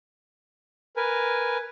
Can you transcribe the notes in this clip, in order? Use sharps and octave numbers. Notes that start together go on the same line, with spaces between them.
A#4 B4 G#5